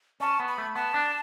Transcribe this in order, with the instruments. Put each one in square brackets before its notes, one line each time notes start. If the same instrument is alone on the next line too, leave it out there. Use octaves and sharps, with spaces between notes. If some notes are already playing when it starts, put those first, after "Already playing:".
[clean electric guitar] C#4 [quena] A5
[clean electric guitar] B3
[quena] B5
[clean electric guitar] A3
[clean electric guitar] B3 [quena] A5
[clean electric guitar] D4